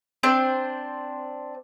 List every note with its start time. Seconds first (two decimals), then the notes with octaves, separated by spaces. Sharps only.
0.23 C4 D4 C5